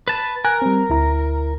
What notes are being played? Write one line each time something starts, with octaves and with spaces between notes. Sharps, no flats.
B4 A5
A#4 G#5 F#6
G3 C4
D2 E4 A#5